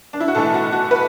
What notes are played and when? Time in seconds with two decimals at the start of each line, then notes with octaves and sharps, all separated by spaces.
0.13 D4
0.20 E4
0.28 F#4
0.35 B1 A2 E3 A3 A4
0.54 F#4
0.72 F#4
0.91 B4